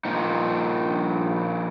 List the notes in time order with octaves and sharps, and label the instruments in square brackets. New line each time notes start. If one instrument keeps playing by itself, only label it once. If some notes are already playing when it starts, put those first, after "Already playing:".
[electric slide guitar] A#2 F3 A#3 D#4